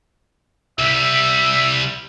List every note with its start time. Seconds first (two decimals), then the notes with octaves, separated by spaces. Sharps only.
0.79 C2 G3 E5